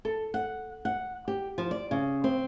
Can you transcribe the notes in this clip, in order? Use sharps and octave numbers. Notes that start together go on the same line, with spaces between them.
A4
F#5
F#5
G4
F3
D5
C#3
C4